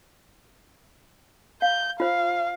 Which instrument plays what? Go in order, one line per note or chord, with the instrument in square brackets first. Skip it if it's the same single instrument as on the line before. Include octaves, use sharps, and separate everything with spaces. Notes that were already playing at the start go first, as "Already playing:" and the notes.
[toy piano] F5 [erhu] G6
[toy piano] F4 C5 [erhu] F5